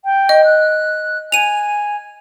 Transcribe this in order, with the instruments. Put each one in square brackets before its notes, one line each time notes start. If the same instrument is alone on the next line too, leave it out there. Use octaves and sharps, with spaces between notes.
[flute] G5
[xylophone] D#5
[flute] F#6
[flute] G#5 [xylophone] D#7 F7